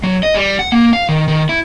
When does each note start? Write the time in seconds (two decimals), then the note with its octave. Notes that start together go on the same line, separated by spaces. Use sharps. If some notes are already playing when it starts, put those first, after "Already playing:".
0.04 F#3
0.23 D#5
0.35 G3
0.59 F#5
0.72 A#3
0.93 F5
1.09 D#3
1.28 D#3
1.49 E4